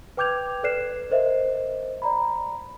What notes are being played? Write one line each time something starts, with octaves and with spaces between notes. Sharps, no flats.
B4 G5 D6 G6 G#6 F7
A4 B4 D5 F#6 C7 E7
A#4 C5 D#5 E5
D5 A#5 B5